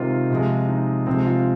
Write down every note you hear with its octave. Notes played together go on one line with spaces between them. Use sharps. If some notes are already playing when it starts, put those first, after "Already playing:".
Already playing: C3 D#3 G#3 F4 C5
C3 F3 G#3
D#4
C3 F3 G#3 C4
F4